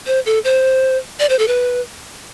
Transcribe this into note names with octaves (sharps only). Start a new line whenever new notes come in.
C5
A4
C5
D5
C5
A4
B4